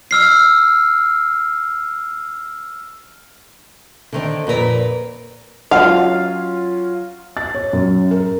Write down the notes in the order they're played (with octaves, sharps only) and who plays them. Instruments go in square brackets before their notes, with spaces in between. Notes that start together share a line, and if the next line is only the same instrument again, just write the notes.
[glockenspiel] E6 F6 C7
[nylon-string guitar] D3 D#3 C4
F2 A#2 A#4 B4
[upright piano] F#3 C#4 F4 [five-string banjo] F5 [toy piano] F#5
[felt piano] A6
C#5
F#2
A#4